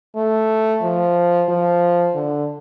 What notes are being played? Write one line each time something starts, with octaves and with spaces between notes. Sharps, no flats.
A3
F3
F3
D3